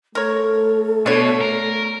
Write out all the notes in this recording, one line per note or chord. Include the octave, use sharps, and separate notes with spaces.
A3 A4 A#4 C#5
B2 D4 C#5
A#4